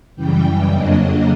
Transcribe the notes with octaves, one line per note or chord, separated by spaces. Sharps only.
F#2 C#3 E3 G3 G5
F2 C#3 F#3 A#3 D4 D#5